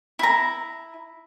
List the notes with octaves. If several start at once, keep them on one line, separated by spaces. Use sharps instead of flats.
E4 A#5